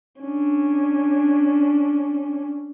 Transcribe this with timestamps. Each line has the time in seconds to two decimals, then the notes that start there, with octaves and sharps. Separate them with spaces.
0.22 C#4 D4